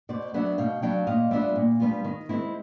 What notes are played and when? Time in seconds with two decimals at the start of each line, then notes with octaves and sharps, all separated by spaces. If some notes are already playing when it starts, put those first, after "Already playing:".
0.09 B2 C5 D5
0.34 F#3 B3 D4 E5 F#5
0.58 B2 F5 G5
0.82 F#3 B3 D4 F5 G5
1.07 A#2 D#5 F5
1.31 G3 B3 D4 F4 D5 E5
1.56 A#2
1.80 G3 B3 D4 F4
2.04 D#3
2.29 G#3 C4 E4